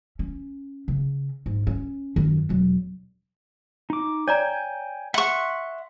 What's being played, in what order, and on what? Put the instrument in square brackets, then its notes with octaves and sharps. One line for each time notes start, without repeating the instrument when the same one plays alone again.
[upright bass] C#4
C#3
G#2
C#4
F#2 D#3
E1 F#3
[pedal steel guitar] D#4 D6
[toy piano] C#5 D5 A#5 [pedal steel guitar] G5 G#5
[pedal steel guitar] E5 C6 [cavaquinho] F#5 C#6